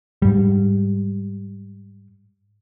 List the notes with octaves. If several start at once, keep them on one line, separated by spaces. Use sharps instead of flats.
G#2 G3